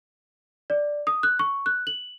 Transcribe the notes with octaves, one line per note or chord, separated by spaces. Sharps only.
D5
D#6
F#6
C#6
F#6
F#7